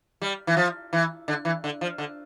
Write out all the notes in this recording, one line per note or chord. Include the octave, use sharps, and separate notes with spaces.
G3
E3
F3
E3
D3
E3
D3
F3
D3